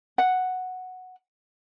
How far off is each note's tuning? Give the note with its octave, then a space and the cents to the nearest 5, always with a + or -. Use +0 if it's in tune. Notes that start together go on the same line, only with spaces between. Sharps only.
F#5 -5